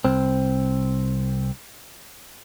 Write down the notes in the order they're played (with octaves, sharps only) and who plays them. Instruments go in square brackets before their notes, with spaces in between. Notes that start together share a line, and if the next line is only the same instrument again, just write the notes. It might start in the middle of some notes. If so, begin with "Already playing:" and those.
[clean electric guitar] C2 C4